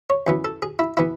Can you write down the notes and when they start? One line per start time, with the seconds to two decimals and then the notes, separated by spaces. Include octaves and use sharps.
0.10 C#5
0.27 F#2 E3 B3
0.45 A4
0.62 G#4
0.79 E4
0.97 E3 B3 E4